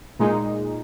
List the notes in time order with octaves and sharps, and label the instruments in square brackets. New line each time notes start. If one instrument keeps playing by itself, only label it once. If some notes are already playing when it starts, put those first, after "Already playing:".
[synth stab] A#2 G#3 D#4